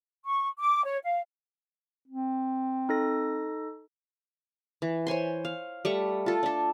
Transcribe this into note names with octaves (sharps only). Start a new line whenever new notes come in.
C#6
D6
C#5
F5
C4
D#4 A4 A#6
E3
C5 C#5 G#5 C6
F5
G3 A3 C#6
F4 A4
D4 A4